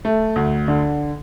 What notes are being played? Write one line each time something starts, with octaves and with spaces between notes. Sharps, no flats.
A3
D2
D3